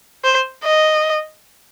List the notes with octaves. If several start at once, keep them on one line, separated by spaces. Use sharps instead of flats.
C5
D#5